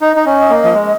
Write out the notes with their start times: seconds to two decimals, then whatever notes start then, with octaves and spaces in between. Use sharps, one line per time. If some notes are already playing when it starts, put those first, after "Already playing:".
0.01 D#4 D#5
0.16 D#4
0.26 C#4
0.50 A#3
0.64 F3
0.73 G#3